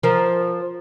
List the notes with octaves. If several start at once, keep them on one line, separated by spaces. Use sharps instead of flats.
F3 A#4